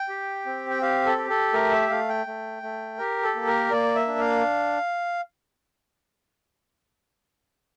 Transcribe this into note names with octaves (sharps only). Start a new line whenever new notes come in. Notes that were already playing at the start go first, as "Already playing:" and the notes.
Already playing: G5
G4
C4
G5
G4 F5
A4
G4
A4
A3 A#4
E5
A3 F5
G5
A3
A3
G4 A#4
A4
A#3
A#4
A#3 D5
E5
D4
F5